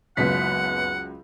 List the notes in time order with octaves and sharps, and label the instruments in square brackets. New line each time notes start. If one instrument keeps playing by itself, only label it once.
[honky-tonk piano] F#1 B3 B6 [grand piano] C#2 F#3 [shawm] F#5